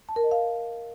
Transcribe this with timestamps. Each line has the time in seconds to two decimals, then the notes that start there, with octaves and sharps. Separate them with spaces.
0.09 A5
0.16 A#4
0.24 D#5
0.31 F5